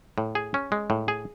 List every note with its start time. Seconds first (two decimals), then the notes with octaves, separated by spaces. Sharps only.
0.18 A2
0.35 G#4
0.54 C#4
0.72 G#3
0.90 A2
1.08 G#4